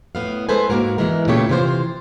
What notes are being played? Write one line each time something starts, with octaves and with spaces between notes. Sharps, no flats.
A2 B3 F5
G#3 A4 B4 C5 G#5
G#2 G#3 A#3 F#4 A#4
E2 D3 E3 G#3 A#4
A#2 C#3 A3 E4 G4 C#5
C3 E3 F4 C5